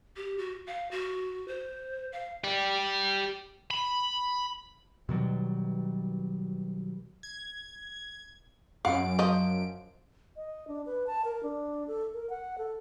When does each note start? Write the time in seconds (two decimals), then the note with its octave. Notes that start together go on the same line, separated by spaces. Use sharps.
0.16 G4
0.38 F#4
0.67 F5
0.91 F#4
1.48 C5
2.13 F5
2.44 G4 D5
3.71 B5
5.09 B2 D#3 F#3 G3
7.23 G#6
8.85 F#2 F5 F#5 D7
9.19 F3 D#5
10.36 D#5
10.68 D4
10.86 B4
11.07 A5
11.25 A#4
11.43 D4
11.88 A4
12.14 A#4
12.30 F#5
12.58 A4